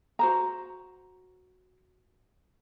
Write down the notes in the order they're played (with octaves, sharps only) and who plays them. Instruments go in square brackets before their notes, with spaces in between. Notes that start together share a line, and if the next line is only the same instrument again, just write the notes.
[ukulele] F#4 C5 A#5